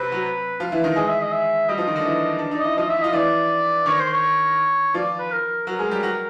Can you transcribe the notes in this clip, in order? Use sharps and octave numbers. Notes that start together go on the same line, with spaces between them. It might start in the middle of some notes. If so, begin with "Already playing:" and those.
Already playing: C3 C4 B4
F#3 F#4
F3 F4
E3 E4
D#3 D#4
G#3 G#4 D#5
E5
D#5
E5
G3 G4 D#5
F3 F4
D#3 D#4
D3 D4
E3 E4
D4
D#4 D5
E4 D#5
F3 F4 D#5
E5
E4
F4 D#5
E3 E4 D5
D#3 D#4 C#5
C5
C#5
F3 F4 D5
B4
A#4
F#3 F#4 A#4
G#3 G#4
G3 G4
F#3 F#4